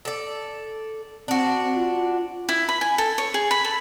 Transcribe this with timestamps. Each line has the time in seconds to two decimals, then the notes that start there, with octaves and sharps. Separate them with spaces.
0.05 A4 D5
1.28 C4 D4 F#4
1.76 F4
2.49 E4
2.69 B5
2.81 G#5
2.98 A4
3.18 C#5
3.34 G#4
3.51 B5
3.64 A4